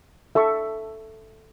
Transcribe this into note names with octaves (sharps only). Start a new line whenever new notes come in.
A4 E5 A5 C#6